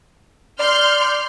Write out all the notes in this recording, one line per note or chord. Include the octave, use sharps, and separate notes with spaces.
D5 C6 F6 G6